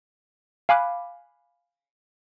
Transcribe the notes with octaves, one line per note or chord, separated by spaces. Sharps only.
F5 G#5 B5 D6 F#6